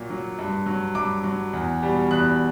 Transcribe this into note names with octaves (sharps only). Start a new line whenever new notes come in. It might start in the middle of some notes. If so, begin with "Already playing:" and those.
Already playing: A#2 F#3
F#3
G2
F#3
G2 D6
F#3
E2
B2 G3
E2 F#6